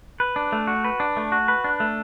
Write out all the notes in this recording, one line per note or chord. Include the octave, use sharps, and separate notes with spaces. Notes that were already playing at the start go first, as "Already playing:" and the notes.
B4
D4
A3
F#4
B4
D4
A3
F#4
B4
D4
A3